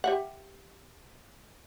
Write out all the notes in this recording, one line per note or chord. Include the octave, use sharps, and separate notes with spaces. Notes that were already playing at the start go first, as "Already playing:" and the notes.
G4 E5 F#5